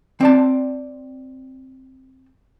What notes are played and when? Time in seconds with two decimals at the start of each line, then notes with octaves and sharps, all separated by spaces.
0.21 C4 D5 A5